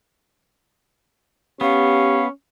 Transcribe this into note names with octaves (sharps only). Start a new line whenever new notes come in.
B3 C#4 G4 F5